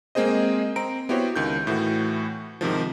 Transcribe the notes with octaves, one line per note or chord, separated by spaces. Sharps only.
G#3 A#3 C4 G#4 C5 D#5
C4 A#5 D7
B3 E4 F#4 G4 C5 C#5
C#2 D#3 G6
A2 E3 F#4
G#2 C3 D#3 F3